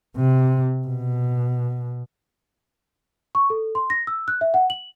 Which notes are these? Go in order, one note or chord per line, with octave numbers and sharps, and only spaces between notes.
C3
B2
C#6
A4
C6
A#6
E6
F#6
E5
F#5
F#7